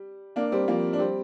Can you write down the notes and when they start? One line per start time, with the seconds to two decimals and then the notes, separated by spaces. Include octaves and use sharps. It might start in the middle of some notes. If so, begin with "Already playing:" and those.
Already playing: G3
0.36 A#3 D4
0.52 G3 C4
0.68 F3 A#3
0.93 D4
0.99 G3 C4